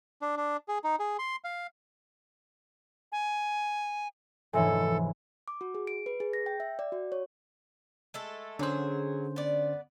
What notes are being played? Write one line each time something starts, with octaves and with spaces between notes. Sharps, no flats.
D4
D4
G#4
D#4
G#4
C6
F5
G#5
F1 G#2 E3 A4 C#5 E5 G#5
D6
F#4
G#4
D7
B4
G#4
A#6
G5
E5
D5
F#4
C#5
G#3 A3 A4
D3 F#3 C#4 G#4 C5
B3 D5